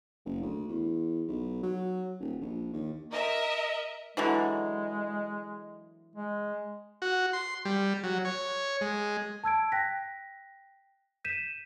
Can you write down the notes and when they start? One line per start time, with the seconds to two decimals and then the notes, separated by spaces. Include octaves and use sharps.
0.25 F#1
0.42 D2
0.68 E2
1.28 B1
1.63 F#3
2.20 D#1
2.41 A#1
2.73 D#2
3.12 A#4 D#5 E5
4.17 D3 E3 F#3 G#3
6.16 G#3
7.02 F#4
7.33 C6
7.65 G3
8.04 F#3
8.25 C#5
8.81 G#3
9.44 A5 E6 G#6 D7
9.72 G5 F#6 A#6 B6
11.24 G6 B6 D#7 E7